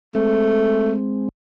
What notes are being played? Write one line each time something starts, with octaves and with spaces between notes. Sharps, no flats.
G#3 A3 C4